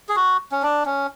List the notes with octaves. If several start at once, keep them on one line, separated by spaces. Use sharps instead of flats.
G#4
F#4
C#4
D4
C#4